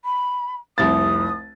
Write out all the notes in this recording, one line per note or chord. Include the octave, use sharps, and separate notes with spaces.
B5
F1 C2 D#6 A6